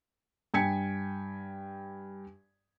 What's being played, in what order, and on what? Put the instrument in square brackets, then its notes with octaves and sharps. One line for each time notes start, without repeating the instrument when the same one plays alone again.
[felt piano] G2 G5 G#5 G#6 B6 C#7